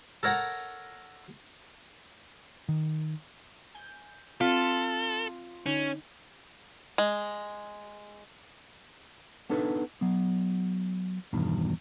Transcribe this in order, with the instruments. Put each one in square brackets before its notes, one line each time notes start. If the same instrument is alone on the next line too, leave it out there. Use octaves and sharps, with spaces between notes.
[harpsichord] A4 A#4 C#5 F#5 A#5
[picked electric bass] D#3
[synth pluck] G#5 G6
[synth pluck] C4 B6 [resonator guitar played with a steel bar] F4 [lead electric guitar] A4
[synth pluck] D3 D#4 [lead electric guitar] C#4
[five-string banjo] G#3
[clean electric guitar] B3 D4 D#4 A4 B4
F#3 B3
E2 G2 B2 D#3